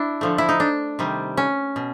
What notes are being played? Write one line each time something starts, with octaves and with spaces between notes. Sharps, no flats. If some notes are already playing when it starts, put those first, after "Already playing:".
Already playing: D4 E4
D3 F3 A3
E4
D#4
D4
C3 D#3 G3
C#4
B2